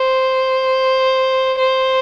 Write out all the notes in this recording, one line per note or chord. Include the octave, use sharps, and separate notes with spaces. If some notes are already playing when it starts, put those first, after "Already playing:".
Already playing: C5
C5